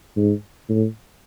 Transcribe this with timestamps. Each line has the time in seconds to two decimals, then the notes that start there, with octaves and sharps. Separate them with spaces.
0.17 G#2
0.69 A2